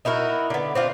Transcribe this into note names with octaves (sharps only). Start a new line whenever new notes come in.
D#4 E4 F#4 A#4
D3 B3
C4 D4 F4